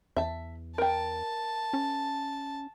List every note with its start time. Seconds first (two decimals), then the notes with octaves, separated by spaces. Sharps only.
0.17 E2 E5 A5
0.78 A#4 G5 A5
1.73 C#4